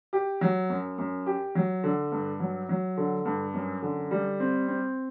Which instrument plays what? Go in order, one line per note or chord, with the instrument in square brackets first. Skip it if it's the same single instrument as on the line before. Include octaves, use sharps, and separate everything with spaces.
[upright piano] G4
F#3
F#2
F#2
G4
F#3
D3
G2
F#3
F#3
D3
G2
F#2
D3
G3
C4
C4